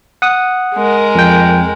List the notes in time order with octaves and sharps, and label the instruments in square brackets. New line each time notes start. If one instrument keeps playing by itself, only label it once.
[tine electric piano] F#5 D#6
[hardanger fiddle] G#3 A#4
[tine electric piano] F2 G5